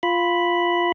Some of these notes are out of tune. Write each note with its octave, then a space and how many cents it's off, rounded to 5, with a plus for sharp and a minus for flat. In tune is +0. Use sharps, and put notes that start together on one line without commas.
F4 +0 B5 +0